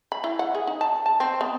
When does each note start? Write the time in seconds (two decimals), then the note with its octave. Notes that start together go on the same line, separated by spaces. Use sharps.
0.12 B5
0.24 E4
0.39 F#5
0.55 G#4
0.67 D#4
0.81 A5
1.06 A5
1.20 C4
1.41 B3